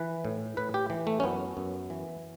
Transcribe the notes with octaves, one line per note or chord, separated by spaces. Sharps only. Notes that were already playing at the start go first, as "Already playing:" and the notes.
Already playing: E3 B4
A2
A2 B4
G4
E3
A3
C#4
F#2 B3
F#2
E3